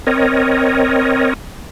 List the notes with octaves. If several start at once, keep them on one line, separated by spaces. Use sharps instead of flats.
C4 A#4 C#5 D#5